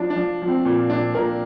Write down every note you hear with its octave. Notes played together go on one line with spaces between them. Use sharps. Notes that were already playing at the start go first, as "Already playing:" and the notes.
Already playing: F3 D4
D4
F3
F3
C4
A#2
A#2 D4
A#2 A#4